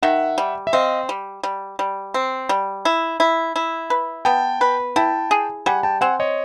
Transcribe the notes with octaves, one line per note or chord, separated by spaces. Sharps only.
D#3 E5 F#5
G3
E5
C4 D#5 F5
G3
G3
G3
C4
G3
E4
E4
E4
B4
B3 G5 A5
B4
E4 G5 A5
G#4
G3 F#5 G#5
G5 A5
C4 F#5 G#5
C#5 D#5